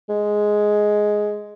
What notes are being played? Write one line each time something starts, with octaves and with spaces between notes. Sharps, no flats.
G#3